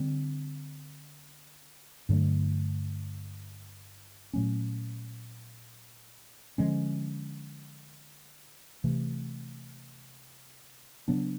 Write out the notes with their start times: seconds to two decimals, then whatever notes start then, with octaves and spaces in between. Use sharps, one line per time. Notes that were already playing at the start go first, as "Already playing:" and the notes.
Already playing: D3 G3 C4
2.09 G2 D3 F#3 A3
4.34 A#2 F#3 A3 C#4
6.58 D3 F3 G#3 C#4
8.84 C3 E3 A3
11.08 C#3 F#3 B3 D4